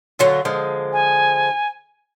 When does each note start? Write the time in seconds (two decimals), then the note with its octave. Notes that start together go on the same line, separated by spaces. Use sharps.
0.19 D3 F#3 F4
0.45 D3 F3 G#3
0.93 G#5